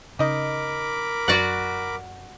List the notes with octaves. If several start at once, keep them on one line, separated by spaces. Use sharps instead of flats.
C#3 D#4 A#4 D#5 B5 D6
F#2 F#4 D5 F#5